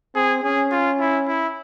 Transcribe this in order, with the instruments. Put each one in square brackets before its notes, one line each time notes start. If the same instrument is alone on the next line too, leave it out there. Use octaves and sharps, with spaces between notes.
[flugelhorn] C4 [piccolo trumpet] G#4
[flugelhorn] C#4 [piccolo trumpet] G#4
[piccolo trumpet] F4
E4
E4